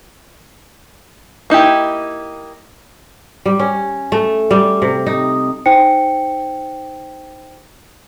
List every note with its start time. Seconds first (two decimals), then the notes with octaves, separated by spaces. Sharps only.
1.50 A#3 D#4 E4 G4
3.46 G3
3.59 C#4
4.12 A3
4.51 G3
4.82 C3
5.06 D#4
5.66 D#4 C5 G5 C#7